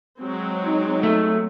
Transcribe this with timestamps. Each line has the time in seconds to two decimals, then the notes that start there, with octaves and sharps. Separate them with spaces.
0.21 F#3 G#3 C4
0.64 D#4
1.03 A3